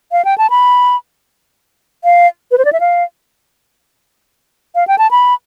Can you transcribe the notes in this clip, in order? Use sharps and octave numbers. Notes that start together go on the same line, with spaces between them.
F5
G5
A5
B5
F5
B4
C5
D5
E5
F5
F5
G5
A5
B5